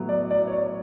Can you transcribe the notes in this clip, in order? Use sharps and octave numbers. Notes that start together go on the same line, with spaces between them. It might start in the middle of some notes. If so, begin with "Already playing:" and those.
Already playing: A2 F#3 B3
D5
D5
C#5
D5